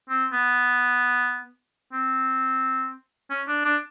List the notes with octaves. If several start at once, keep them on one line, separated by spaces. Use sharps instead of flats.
C4
B3
C4
C#4
D4
D4